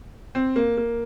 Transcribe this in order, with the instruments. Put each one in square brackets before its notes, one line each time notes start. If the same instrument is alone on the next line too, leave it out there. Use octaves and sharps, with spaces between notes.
[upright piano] C4
A#3
A#3